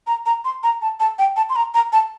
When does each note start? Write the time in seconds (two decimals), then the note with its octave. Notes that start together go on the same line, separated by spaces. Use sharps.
0.07 A#5
0.26 A#5
0.45 C6
0.63 A#5
0.82 A5
1.00 A5
1.19 G5
1.36 A5
1.50 C6
1.56 A#5
1.74 A#5
1.93 A5